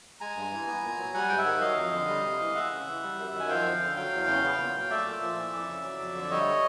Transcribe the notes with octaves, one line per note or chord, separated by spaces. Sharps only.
G#3 G#5 A#5
G2
E3
B3
A#2
F#3
G3 F#5 G#5
G#2 G5
E5 F#5
D#3
F#3 D#5 F5
F2
D3
G3
C3
E3
G#3 E5 F#5
C#3
E3
G3
F#2
D#3
G#5
F3 F5 G5
F2
D3
F#3 F5 G5
E2
C#3
B3
A#2
F#3 F5
A3 D5 E5
A#2
F3
E3
F2
C#3
F#3
F2
D3
D5
G3 C#5 D#5